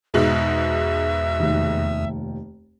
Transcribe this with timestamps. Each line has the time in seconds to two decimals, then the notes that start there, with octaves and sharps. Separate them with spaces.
0.14 E2 G#2 B2 G#3 E5
1.39 F1 D#2 D#3